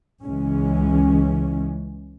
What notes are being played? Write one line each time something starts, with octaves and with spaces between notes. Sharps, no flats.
C#2 E3 G#3 C#4